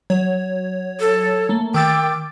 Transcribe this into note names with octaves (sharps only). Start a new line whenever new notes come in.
F#3 C#5
A4
A3 A#3
D#3 G5 D6 E6 A6